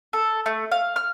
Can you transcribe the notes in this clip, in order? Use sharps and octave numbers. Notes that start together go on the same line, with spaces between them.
A4
A3
F5
F6